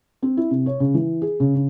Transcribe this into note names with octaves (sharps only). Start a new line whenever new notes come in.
C4
E4
C3
C#5
C#3
E3
G#4
C#3
C#3